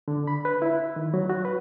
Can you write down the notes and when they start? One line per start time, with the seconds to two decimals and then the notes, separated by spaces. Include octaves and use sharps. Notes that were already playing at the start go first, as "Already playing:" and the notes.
0.08 D3
0.27 B5
0.45 B4
0.62 E4
0.96 D#3
1.14 F#3
1.30 F#4
1.45 B4